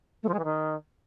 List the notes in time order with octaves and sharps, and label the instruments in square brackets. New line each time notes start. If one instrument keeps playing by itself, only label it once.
[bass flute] A3
F3
G#3
E3
D#3